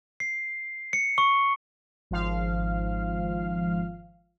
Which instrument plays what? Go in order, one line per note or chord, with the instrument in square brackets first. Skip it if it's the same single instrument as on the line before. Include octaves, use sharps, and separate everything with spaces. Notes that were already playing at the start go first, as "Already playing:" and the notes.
[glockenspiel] C7
C#7
C#6
[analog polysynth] G#1 F3 F5